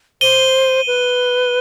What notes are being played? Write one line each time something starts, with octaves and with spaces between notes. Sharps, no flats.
C5 D#7 G7
B4